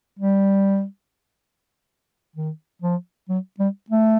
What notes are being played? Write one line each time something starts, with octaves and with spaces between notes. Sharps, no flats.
G3
D#3
F3
F#3
G3
A3